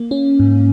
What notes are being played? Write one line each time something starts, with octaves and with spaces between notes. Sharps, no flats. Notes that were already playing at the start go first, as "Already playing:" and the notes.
Already playing: A#3
C#4
G#2